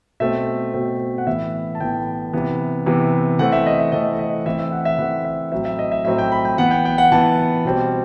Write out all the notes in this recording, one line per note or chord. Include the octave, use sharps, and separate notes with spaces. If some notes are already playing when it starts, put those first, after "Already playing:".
B2 A3 C4 E5
B2 A3 C4
F#5
A2 E3 B3 E5
A5
A2 E3 B3 G5
C3 E3 B3
C3 E3 B3
E3 A3 C4 F#5
E5
D#5
E5
E3 A3 C4 D#5
D#5
E3 A3 C4 E5
E5
F#5
E5
E3 A3 C4 F#5
E5
A2 F#3 C4 E5
E5
D#5
E5
A2 F#3 C4 E5
G5
B5
G5
E3 B3 F#5
G5
G5
F#5
E3 B3 A5
B2 G3 C4